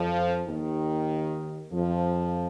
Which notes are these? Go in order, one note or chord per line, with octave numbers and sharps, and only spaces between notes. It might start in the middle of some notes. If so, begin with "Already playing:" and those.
Already playing: F2 F3
D#2 D#3
F2 F3